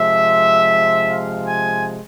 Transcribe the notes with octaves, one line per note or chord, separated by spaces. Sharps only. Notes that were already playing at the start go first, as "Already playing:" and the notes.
Already playing: C3 F3 G#3 E5
F5
G#5